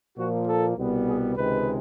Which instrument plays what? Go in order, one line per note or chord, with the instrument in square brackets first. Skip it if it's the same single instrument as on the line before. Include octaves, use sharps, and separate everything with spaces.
[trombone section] A#2 F3 A#3 F#4
A4
C2 B2 G3 B3
G#4
C#2 C3 D#3 G#3 B4